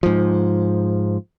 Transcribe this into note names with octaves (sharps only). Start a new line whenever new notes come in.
G#2 F3